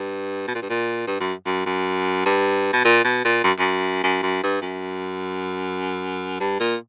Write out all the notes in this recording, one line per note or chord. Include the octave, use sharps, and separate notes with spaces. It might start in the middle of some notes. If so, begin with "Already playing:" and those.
Already playing: G2
B2
A#2
G2
A#2
G2
F#2
F#2
F#2
G2
B2
A#2
B2
A#2
F#2
F#2
F#2
F#2
G2
F#2
G2
A#2